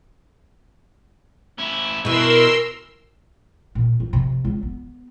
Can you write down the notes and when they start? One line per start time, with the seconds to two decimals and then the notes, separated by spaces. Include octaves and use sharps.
1.58 C#4 E4
2.05 B2 E3 E4 A#4 C6 E6
3.75 A#2
4.00 F3
4.13 C3
4.45 C#2
4.63 B3